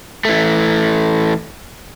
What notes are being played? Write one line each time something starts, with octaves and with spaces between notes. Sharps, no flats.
E3 A3